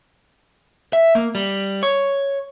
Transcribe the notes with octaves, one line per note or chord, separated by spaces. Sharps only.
E5
A#3
G3
C#5